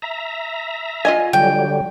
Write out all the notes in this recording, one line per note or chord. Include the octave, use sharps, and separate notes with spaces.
E5 A#5
F4 D#5 G#5
D3 F#3 G3 G5